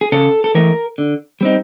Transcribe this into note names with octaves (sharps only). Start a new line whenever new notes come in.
G#4
C#3 A4
A4
E3 A3 A#4
D3
G3 C4 D#4